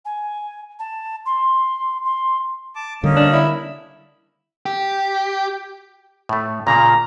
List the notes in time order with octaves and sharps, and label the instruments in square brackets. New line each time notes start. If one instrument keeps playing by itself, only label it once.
[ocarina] G#5
A5
C6
C6
[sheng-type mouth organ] A5 D6
[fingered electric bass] D3 G3 [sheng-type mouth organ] A#3 C#4 D#4
[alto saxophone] D4
E4
[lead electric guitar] G4
[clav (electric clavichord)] A2 A3
[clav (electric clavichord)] A#2 C#3 A#3 [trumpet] A#5